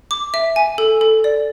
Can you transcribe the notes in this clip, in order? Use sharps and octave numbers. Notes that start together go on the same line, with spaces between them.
D6
E5
G#5
A4
A4
D5